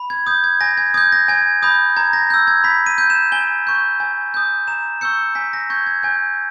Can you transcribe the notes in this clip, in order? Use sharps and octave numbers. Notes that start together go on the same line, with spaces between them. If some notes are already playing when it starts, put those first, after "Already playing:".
Already playing: B5
G#6
D#6 G6
G#6
G#5 A#6
G#6
D#6 G6 G#6
A#6
G#5 G#6
B5 D#6 G6
A#5 G#6
A#6
E6 G6
G#6
B5 B6
D#7
G6
E7
G#5 G7
C#6 G6
G#5
D#6 G6
A#5 E7
C#6 E6 G6 C#7
G#5 B6
A#6
C#6 G6 G#6
G#6
G#5 G6